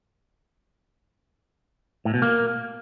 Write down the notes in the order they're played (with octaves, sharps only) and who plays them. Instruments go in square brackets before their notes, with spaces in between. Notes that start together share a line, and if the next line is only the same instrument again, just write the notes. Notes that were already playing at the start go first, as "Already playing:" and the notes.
[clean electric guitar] A2
B2
A#3